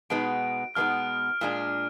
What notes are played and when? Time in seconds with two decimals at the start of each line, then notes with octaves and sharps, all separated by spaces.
0.10 B2 G#3 B3 D#4 D7
0.75 B2 G#3 B3 D#4 F6
1.41 A#2 G#3 D4